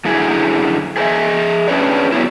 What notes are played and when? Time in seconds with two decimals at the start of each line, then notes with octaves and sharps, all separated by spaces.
0.05 F#2 D3 E4 G#4
0.97 G#4 B4 C5 D#5 E5
1.68 C#4 D4 G#4 B4 C#5 D5
2.12 F#3 B3 E4